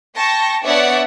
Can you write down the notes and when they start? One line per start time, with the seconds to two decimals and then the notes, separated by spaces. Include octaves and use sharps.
0.15 G5 A5 C#6 A#6
0.64 B3 D4 C#5 D5 E5 F#5